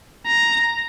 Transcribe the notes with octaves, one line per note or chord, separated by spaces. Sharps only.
A#5